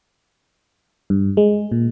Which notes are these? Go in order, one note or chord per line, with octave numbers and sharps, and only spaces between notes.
G2
G#3
A#2